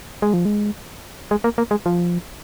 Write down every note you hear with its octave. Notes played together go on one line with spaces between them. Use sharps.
G#3
F3
G#3
G#3
A#3
A#3
G#3
F3